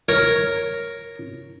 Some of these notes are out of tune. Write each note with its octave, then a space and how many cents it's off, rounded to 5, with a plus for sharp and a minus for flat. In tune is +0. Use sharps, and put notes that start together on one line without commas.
A#4 +0 C#5 +0